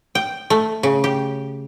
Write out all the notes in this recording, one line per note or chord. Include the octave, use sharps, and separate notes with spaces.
G5
A3
C#3
G4